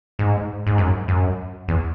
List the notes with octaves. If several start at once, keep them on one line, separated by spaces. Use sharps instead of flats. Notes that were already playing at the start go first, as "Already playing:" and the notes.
G#2
G#2
F#2
F#2
E2